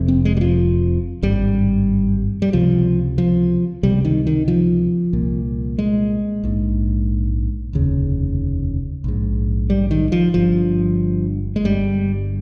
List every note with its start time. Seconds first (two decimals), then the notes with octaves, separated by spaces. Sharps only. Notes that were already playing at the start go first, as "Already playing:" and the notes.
Already playing: F1 F2 C3
0.08 C4
0.25 G#3
0.37 G3
0.41 F3
1.22 G#1 G2 G3
2.42 G3
2.53 C#2 C3 F3
3.18 F3
3.83 C#2 C3 G3
4.05 D#3
4.27 D#3
4.48 F3
5.13 C2 A#2
5.79 G#3
6.44 A#1 G#2
7.73 F1 D#2 C#3
9.04 A#1 G#2
9.70 G3
9.91 D#3
10.12 F3
10.34 G1 G2 F3
11.56 G#3
11.64 G1 G2 G3